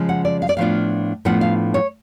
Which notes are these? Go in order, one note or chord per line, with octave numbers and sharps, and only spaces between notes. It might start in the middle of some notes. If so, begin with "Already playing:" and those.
Already playing: C#3 F3 G#3
F#5
D5
F5
D5
A2 F3 B3 D4 F4 F5
A2 F3 B3 D4 F4 F#5
F5
C#5